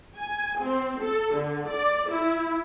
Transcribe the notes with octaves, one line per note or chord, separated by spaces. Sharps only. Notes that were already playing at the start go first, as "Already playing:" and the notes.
G#5
C4
A4
D3
D5
E4